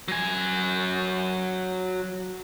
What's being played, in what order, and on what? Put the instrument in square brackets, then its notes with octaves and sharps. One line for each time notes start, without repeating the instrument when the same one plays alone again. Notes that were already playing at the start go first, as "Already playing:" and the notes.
[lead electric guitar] F#3 G#5